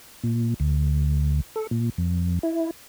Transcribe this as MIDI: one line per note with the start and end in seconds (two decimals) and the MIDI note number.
0.23 0.54 46
0.60 1.41 38
1.56 1.67 69
1.71 1.90 46
1.98 2.39 41
2.43 2.71 64